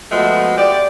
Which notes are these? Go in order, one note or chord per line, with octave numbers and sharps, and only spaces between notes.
F3 G#3 A3 B3 F#4
G4 D5